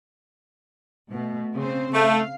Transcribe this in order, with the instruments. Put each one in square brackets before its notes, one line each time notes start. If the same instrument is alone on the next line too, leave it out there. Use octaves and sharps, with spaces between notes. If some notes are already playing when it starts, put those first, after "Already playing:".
[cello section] B2 A3
C#3 C4 C5
[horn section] A3 [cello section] F5